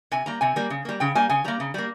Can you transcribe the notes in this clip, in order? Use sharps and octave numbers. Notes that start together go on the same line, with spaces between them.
C3 G#5
G3 A#3 A#5
C3 G#5
G3 A#3
C#3
G3 A#3
C#3 G5
G3 A#3 G#5
C#3 G#5
G3 A#3 A#5
C#3
G3 A#3